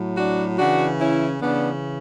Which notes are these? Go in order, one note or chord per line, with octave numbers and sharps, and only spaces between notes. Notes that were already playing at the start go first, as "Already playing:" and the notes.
Already playing: A2 F#3
D4 F#4
C#3 E3 D4 F#4
C#4 E4
C#3 E3 B3 D4